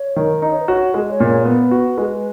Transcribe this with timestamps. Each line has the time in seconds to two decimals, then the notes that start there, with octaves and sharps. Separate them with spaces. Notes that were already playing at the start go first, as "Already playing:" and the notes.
Already playing: C#5
0.16 D#3
0.42 D#4 D#5
0.51 C#5
0.60 B4
0.68 F#4 C#5
0.94 G#3 D#5
1.07 D#5
1.11 C#5
1.20 A#2
1.28 C#5
1.45 B3 B4
1.71 F#4
1.98 G#3